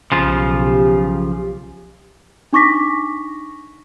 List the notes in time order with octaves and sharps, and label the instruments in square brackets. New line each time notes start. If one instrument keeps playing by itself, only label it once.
[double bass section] B1 [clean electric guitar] C#3 F3 F4 [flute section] G4
[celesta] D4 D#4 C#6 D6 A#6 B6